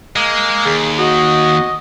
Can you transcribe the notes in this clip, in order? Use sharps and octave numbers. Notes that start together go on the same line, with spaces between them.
G#3 A#3
D#2 G#4
F#4 D#5